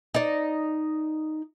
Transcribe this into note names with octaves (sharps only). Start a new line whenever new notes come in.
D#4 D5